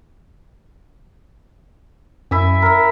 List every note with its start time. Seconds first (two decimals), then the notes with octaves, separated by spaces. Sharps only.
2.31 F#2 E4 E5 G#5
2.62 A#4 E5